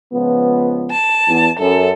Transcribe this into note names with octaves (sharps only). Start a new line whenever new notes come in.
C#2 F3 B3
A5
E2
F#2 A4